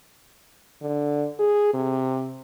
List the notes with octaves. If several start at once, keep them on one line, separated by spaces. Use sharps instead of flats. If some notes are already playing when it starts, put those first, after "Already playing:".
D3
G#4
C3